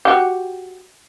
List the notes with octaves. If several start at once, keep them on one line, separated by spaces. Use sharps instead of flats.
F#4 G4